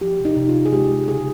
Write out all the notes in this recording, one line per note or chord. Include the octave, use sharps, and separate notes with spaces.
F3 G4
C3
D#4
C3
F4
C3
G#4
G#3 G4
G#3
C#3 G#4